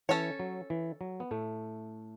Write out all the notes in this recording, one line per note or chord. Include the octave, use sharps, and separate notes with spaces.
E3 C#4 A4 C#5
F#3
E3
F#3
B3
A2 A3